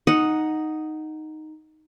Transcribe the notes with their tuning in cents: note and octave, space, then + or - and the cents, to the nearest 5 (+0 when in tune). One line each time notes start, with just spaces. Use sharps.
D#4 +0 F#5 +0